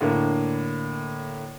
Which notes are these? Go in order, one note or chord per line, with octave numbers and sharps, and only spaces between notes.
A2 D3 A#3